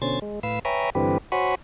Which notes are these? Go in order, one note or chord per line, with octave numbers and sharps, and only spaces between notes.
B2 D3 C#4 C5 G#6 A6
G#3
A2 B4 F5 E6
B4 C#5 E5 G5 G#5 A#5
G2 D3 E3 C4 G4 B4
F#4 C5 C#5 F#5 G#5 B5